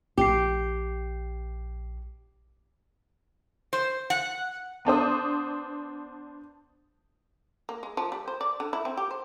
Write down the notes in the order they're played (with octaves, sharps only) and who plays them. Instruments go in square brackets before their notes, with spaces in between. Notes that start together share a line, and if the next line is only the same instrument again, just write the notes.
[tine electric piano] A#1 C7 [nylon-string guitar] G4
[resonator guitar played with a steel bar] C5
F#5
[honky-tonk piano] B3 D4 C5 D#6
[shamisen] A#3
G#3
F3
G3
C5
D5
D3
E4
C4
G4
C5